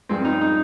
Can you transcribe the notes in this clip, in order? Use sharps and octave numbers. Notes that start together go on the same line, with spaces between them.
G2 F3 G#3 C4
D#4
D#4